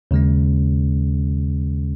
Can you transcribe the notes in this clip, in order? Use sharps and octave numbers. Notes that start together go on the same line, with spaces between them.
D#2 C#3 G#3 C#4